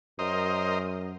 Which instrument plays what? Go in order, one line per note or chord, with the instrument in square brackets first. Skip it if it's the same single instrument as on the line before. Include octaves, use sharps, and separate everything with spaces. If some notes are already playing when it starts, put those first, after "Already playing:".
[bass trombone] F#2 [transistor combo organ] A#4 C5 D#5